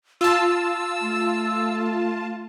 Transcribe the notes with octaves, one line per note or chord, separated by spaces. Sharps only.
F4 A5 E6
A3